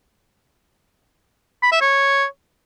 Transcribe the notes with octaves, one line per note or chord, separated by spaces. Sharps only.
B5
E5
C#5